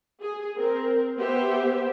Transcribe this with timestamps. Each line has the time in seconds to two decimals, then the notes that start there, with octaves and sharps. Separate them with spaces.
0.22 G#4
0.57 C4 A#4
1.18 B3 G4 C5 E5